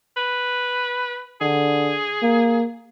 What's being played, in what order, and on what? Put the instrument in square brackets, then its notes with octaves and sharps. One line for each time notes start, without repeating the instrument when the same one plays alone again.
[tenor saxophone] B4
[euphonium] D3 [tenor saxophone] G#4
[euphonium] A#3